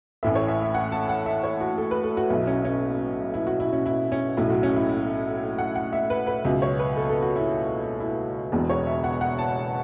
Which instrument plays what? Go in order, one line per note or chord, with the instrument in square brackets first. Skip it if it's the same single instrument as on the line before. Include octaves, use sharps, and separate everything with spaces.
[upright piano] A1 A2 E3 E5
C#5
E5
E5
F#5
A5
F#5
E5
C#5
F#4
A4
B4
A4
F#4
B1 B2 F#3 E4
C#4
C#4
E4
F#4
E4
C#4
E4
C#4
B1 A2 F#3 E4
F#4
C#4
E4
E4
F#5
F#5
E5
B4
B4
C#2 B2 F#3 E5
C#5
B4
A4
A4
F#4
E4
E4
E1 E2 B2
C#5
E5
F#5
F#5
A5